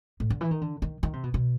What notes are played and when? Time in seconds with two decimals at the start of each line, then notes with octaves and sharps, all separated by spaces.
0.20 A2
0.30 D3
0.41 E3
0.51 D#3
0.61 D3
0.82 D#3
1.03 D#3
1.13 C3
1.24 B2
1.34 B2